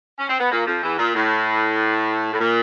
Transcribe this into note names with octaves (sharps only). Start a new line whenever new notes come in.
C#4
C4
B3
A#2 A#3
F2 F3
E2 E3
A#2
A2
A2
A#2